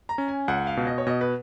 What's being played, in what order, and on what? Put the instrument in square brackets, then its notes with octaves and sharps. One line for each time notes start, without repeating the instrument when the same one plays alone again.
[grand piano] A#5
[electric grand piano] C#4
[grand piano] G#5
[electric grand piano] C#2 [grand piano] F#5
[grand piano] F5
[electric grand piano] B2
[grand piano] D#5
C#5
[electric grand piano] B2 [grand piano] D#5
[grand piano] B4